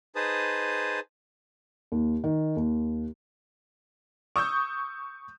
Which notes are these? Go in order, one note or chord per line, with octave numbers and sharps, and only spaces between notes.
D#4 G#4 B4 C5 A5 D#6
D#2
D#3
D#2
C#6 D#6 E6 G6